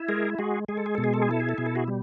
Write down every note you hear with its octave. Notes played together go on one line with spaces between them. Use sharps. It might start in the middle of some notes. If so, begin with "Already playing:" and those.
Already playing: E4
G#3 G#4 A#4
G#3 F#4 G#4
G#3 G#4
A4
G#4
B2 A4
G#4
A4
G#4
E4 A4
G#4
A4
B2 G#4
A4
F#4 G#4
G3